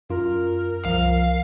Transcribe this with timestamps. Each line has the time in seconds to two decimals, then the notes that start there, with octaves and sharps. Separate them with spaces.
0.10 F#2 F4 A#4
0.85 C2 F3 F5